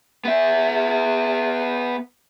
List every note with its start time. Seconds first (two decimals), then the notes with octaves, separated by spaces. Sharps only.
0.25 B3 E5